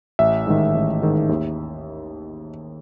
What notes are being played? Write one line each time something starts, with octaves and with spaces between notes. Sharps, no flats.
A1 E5
G#2 D#3
A1
G#2 D#3
D#2